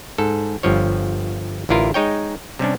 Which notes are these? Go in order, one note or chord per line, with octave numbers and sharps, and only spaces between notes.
G#2 A4
G1 G2 F3 C#5
A1 D3 E4 F4 A#4
G#3 D#4 C#5 G5
C3 G3 C#4 D4